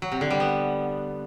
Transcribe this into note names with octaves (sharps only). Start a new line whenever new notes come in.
F#3
C3
D3
G3
B3